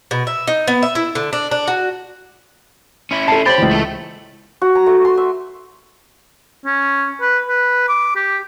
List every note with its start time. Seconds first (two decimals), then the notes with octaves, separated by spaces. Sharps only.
0.11 B2
0.27 E5
0.47 D#4
0.67 B3
0.83 E5
0.95 E4
1.15 D3
1.33 D4
1.51 D4
1.68 F#4
3.11 C#4 E4
3.28 A4 A5 C7
3.46 G4 C5 C#5 B5 A6 F#7
3.58 C#2 E3
3.71 A3 A4
4.61 F#4
4.75 A#5
4.86 A3
5.05 C6
5.17 E5
6.65 C#4
7.21 B4
7.48 B4
7.89 D6
8.16 G4